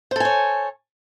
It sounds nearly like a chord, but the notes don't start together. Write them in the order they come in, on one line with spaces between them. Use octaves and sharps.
C5 A4 G#5 C#5